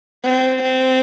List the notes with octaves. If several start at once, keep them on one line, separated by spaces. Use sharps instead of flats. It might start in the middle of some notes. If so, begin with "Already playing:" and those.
C4
C4